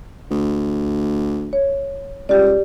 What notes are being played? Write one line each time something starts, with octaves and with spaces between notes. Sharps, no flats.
D2
C#5
C#2 G4 D5